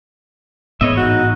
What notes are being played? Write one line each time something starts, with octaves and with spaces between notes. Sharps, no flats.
A1 G#2 B3 C#5 D#5 E5
D#4 F#4